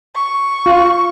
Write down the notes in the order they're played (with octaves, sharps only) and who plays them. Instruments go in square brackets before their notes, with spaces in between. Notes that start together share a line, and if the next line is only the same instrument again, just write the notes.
[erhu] C#6
[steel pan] F4